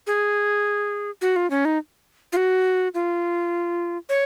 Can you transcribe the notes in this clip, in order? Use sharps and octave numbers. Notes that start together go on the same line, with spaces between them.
G#4
F#4
F4
C#4
D#4
F4
F#4
F4
C#5